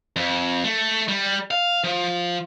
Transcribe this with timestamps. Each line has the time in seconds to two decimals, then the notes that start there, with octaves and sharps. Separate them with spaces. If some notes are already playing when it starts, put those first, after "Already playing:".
0.16 F2
0.64 A3
1.08 G3
1.51 F5
1.84 F3